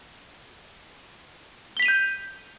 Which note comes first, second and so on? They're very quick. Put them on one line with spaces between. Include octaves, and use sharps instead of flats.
G7 B6 F7 D#7 G6